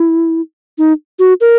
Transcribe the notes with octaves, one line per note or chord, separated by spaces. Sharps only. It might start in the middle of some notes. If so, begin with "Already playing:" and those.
Already playing: E4
D#4
F#4
A#4